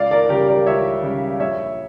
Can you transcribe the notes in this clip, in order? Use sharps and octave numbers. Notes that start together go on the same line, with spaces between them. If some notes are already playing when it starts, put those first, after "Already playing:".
Already playing: C#2 D5 F5
A#4 D5
C#3 G3 G4 A#4
A#4 D5
C#2 C#5 E5
C#3 G3
A#1 C#5 E5